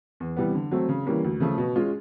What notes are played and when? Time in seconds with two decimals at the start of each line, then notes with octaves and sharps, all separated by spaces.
0.20 E2
0.37 C3 E3 G3 B3
0.55 D3
0.71 F#3 A3 C4
0.89 C#3
1.06 E3 G3 A#3 C#4
1.24 D2
1.40 C#3 F3 A3
1.58 B2
1.76 G#3 C#4 F4